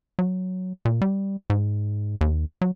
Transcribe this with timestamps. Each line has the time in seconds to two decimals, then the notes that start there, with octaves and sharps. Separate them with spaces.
0.19 F#3
0.85 A#2
1.02 G3
1.50 G#2
2.21 D#2
2.61 F#3